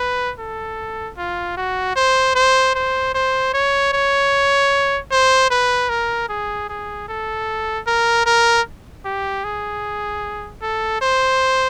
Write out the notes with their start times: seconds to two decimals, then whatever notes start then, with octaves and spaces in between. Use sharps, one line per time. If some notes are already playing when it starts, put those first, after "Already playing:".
Already playing: B4
0.39 A4
1.18 F4
1.57 F#4
1.96 C5
2.35 C5
2.75 C5
3.14 C5
3.54 C#5
3.93 C#5
5.11 C5
5.51 B4
5.89 A#4
6.29 G#4
6.69 G#4
7.09 A4
7.87 A#4
8.26 A#4
9.05 G4
9.44 G#4
10.62 A4
11.01 C5